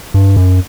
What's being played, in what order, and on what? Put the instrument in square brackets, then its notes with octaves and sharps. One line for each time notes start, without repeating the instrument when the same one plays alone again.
[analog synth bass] G2
F#2